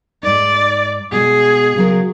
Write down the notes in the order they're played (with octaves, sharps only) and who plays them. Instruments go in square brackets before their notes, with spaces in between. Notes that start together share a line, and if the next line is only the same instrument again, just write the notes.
[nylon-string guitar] G#2 D#4 [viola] D5
[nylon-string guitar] B2 G#3 [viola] G#4
[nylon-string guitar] C#3 F#3 A#4